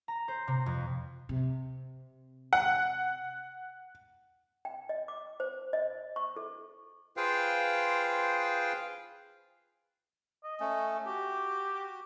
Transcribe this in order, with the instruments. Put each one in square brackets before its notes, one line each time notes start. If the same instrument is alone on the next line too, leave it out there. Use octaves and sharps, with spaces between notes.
[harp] A#5
C5
C3
F2
[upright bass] C3
[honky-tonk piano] F#5
[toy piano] G5
D#5
D6
C5
D#5
C#6
A4
[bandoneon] F4 G#4 B4 C5 F5 G5
[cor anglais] D#5
[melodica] A3 C#4
[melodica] F#4 [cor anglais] G4